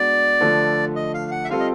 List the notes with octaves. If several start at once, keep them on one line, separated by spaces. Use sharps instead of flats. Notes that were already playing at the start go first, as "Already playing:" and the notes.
Already playing: G#3 B3 D4 F#4 D5
D3 F3 A3
D#5
F5
F#5
E5
G3 C4 F4 A4 F5
D#5